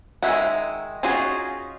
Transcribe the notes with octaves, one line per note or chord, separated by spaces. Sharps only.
D#3 G#3 C5 E5 F#5
C#4 D#4 F4 F#4 G#4